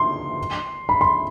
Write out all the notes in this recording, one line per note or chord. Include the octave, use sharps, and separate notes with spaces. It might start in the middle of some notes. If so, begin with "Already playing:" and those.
Already playing: C6
B5
C6